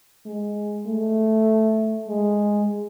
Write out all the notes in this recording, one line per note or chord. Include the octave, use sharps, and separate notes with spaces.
G#3
A3
G#3